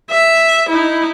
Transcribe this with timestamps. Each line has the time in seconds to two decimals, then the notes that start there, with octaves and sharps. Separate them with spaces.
0.10 E5
0.69 D#4 E4